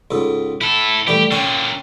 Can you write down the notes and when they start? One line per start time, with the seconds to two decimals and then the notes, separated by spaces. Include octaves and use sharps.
0.11 C#2 G#2 A4
0.61 E4 A4 B5
1.07 E3 G3 A3 G4
1.31 A#2 D3 C#4 C#5 G5